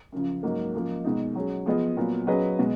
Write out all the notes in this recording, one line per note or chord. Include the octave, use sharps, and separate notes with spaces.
F#2 C#3 F3
G#2 F#3 A#3
F#2 F3 A#3
B2 G#3 D#4
F#3 C#4 G#4
F3 B3 F4 G#4 D#5
A#2 F#3 B3
F#3 C#4 G#4 B4 D#5
B2 G#3